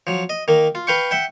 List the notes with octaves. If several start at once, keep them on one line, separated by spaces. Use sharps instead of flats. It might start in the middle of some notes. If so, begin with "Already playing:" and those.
F3 F#3
D#5
D#3 A#3
F4
B4 F5 G5 C#6
E5 F#5 G5